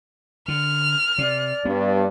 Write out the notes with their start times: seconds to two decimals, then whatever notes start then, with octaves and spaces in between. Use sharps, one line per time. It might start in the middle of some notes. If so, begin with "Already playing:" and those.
0.48 D3 F6
1.18 C3 D5
1.65 G2 B3